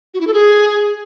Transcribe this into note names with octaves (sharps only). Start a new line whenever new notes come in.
F#4
E4
A4
G#4